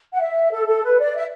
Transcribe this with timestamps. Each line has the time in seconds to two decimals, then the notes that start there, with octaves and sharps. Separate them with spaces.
0.12 F#5
0.19 E5
0.52 A4
0.67 A4
0.84 B4
0.99 D5
1.15 E5